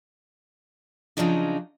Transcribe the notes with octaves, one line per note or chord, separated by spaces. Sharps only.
C#3 F3 F#3 D4 D#4